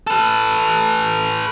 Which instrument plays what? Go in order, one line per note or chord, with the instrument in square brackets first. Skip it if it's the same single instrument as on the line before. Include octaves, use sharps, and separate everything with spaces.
[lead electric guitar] A4 B4